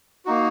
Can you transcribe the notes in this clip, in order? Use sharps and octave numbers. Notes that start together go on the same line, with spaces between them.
A#3 D#4 F#4